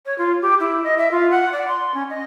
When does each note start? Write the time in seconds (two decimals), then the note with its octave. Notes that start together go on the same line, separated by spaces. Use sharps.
0.06 C#5
0.18 F4
0.42 G4
0.60 E4
0.84 D#5
0.98 E5
1.11 F4
1.31 F#5
1.52 D5
1.68 C6
1.94 C#4
2.10 D#5